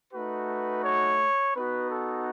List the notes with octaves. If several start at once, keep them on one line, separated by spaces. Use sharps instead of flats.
A3 D#4 F#4 B4
C#5
B3 D#4 F#4 B4
A4